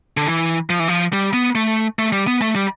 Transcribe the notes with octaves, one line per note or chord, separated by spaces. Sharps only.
D3
E3
F3
E3
F3
G3
B3
A3
A3
G3
B3
A3
G3